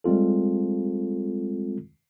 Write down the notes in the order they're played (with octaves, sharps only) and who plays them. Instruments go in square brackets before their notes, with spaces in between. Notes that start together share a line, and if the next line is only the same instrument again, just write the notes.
[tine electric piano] G3 G#3 C4 F4 A4